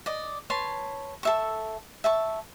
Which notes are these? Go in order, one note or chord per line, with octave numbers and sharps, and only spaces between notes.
D5 D#5
B4 C#5 A5 C6
A4 E5 C#6
E5 A5 C#6